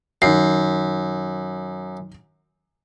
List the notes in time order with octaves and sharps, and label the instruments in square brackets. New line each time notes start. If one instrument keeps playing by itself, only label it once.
[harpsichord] F#2 [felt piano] D#3 C7